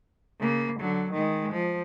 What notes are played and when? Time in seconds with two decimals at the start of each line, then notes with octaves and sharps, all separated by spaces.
0.40 C#3 A#3
0.80 D3 F#3
1.12 D#3 G#3
1.52 F3